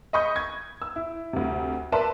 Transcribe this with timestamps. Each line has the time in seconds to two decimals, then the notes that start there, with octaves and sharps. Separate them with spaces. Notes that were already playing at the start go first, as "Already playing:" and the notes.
0.13 D#5 B5 C#6 D#6 G6
0.36 G#6
0.82 E6
0.96 E4
1.33 D2 C3
1.92 A#4 B4 D5 E5 A5 C6